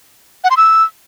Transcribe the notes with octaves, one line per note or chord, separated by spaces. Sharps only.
F#5
C6
E6